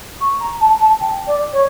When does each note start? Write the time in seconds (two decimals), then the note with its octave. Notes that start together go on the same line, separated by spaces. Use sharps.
0.20 C#6
0.40 A#5
0.60 A5
0.80 A5
1.00 G5
1.26 D5
1.52 C#5